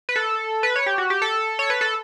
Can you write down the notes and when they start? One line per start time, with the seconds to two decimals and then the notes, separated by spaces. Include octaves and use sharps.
0.09 B4
0.16 A4
0.63 B4
0.76 C#5
0.86 G4
0.98 F#4
1.10 G4
1.22 A4
1.59 C#5
1.70 B4
1.81 A4